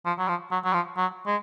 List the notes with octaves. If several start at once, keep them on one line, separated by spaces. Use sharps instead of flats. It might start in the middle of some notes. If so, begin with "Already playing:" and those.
F3
F#3
F3
F#3
F#3
F3
F#3
G#3